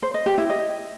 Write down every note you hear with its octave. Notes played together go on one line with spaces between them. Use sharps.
C5
D#5
G4
E4
D#5